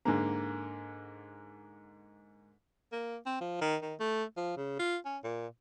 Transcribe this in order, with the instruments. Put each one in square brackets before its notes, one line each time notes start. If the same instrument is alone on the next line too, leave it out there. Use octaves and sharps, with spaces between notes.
[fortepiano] G#2 D3 A#3
[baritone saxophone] A#3
C4
F3
D#3
D#3
A3
F3
C#3
F4
C#4
A#2